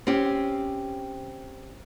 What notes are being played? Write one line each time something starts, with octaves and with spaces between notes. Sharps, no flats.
C4 C#4 G4